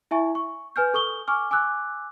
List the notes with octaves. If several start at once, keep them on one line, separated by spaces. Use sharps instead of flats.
E4 E5 G#5 C#6
C#6
B4 G#5 F6 G6
A4 C#6 D#6 G7
G#5 C#6 D6 F6
G#5 D6 E6 F#6